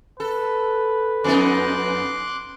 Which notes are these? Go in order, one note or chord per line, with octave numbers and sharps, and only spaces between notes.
A4 B4
F2 B3 D#4 C6 D6 F#6